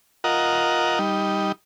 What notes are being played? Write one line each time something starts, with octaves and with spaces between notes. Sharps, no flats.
F4 A#4 D#5 F#5
G3 D#4